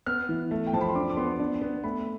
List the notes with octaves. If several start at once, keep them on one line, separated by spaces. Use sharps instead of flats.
B3 F6
E3
A3
G5
F3 A5
B5
C6
D4 D6
D6
B3 C6
D4
B3
A3 B5